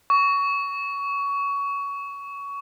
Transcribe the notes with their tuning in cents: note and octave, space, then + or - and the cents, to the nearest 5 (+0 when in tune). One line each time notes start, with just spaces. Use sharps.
C#6 +20